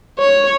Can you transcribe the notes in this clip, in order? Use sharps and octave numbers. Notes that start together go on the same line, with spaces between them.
C#5